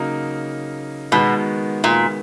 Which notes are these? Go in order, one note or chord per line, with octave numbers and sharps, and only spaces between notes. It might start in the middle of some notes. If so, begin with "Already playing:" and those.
Already playing: C#3 F#3 A#3 D#4
B2 D#3 G#3 B3 F#4
A#2